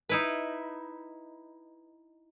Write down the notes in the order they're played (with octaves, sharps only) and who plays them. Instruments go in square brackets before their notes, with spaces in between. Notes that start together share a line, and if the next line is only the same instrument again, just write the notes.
[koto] D#4 E4 B4